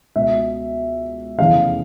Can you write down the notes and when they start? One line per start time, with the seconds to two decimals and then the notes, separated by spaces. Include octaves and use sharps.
0.16 C#2 B2 E5
1.38 F1 E2 C#3 E3 F5